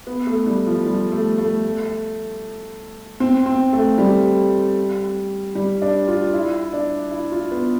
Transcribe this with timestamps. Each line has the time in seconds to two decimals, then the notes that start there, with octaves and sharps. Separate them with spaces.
0.07 B3
0.27 A3
0.46 G3
0.67 F3
0.86 G3
1.12 A3
1.38 A3
3.20 C4
3.46 C4
3.73 A3
3.98 G3
5.55 G3
5.82 D4
6.08 F4
6.33 E4
6.73 D4
7.11 E4
7.32 F4
7.51 B3